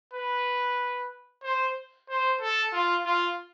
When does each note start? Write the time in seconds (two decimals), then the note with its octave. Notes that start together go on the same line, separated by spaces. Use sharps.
0.13 B4
1.43 C5
2.09 C5
2.41 A4
2.73 F4
3.05 F4